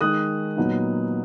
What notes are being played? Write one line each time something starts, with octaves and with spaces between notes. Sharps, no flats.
D#3 G#3 D#4 D#6 F#6
A#2 F#3 B3 D#4